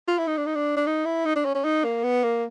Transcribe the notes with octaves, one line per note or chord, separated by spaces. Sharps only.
F4
E4
D#4
D4
D#4
D4
D4
D#4
E4
D#4
D4
C#4
C#4
D#4
A#3
B3
A#3